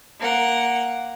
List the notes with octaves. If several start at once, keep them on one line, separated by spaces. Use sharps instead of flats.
A#3 F#5